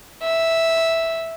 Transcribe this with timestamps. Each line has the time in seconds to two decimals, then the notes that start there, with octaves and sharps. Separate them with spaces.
0.23 E5